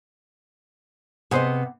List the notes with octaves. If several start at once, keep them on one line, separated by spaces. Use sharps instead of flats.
C3 B3 G#4 C5 D#5